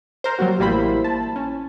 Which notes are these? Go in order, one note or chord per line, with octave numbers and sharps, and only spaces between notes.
A#4 C5
F#3 G3 A#3 F#4
A1 G3 A#3 E4 C5 B5
A5
C#4